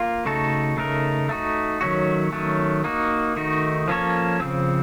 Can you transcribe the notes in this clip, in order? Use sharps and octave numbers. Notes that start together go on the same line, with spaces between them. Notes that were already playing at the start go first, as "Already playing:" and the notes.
Already playing: A#3 F4
C#3 A3 D#4 F#4 A4
C#3 A3 D#4 A#4
A3 D#4 F#4
D#3 F#3 A3 C#4 F#4
D#3 F#3 A3 C#4
A#3 D#4 F#4
D#3 A3 D#4 F#4
F3 A#3 C#4 A4 C#5
C#3 F3 C4